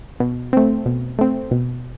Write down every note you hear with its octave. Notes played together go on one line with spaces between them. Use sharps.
B2
A3 C4
B2
A3 C4
B2